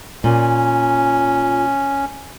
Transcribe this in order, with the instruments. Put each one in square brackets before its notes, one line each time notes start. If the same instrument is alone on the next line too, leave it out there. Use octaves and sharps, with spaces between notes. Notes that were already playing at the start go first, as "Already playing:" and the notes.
[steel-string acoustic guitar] A#2 [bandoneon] C#4